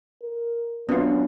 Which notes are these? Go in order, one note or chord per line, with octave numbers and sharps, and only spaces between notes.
A#4
F#2 B3 D4 F4